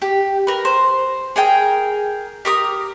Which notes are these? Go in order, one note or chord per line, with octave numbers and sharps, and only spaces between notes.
G4
A#4 B4
C5
G#4 A#4 G5
G4 A#4 D#6